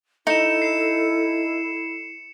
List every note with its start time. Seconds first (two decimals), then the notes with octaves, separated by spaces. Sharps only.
0.27 D#4 E4 A4 C#7 E7
0.62 C7 E7